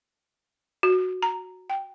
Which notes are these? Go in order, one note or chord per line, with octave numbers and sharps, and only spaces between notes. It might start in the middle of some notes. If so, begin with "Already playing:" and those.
F#4
A#5
G5